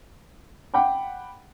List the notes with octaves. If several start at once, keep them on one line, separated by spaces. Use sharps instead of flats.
F#5 G5 B5 D6